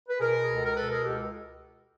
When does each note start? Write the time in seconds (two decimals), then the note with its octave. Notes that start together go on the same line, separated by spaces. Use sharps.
0.09 B4
0.20 B2 G#4 A#4
0.43 G#4
0.48 C#2
0.54 A4
0.64 A#4
0.76 B2 A4 B4
0.90 G#4 A#4
1.03 C#2 G4 A4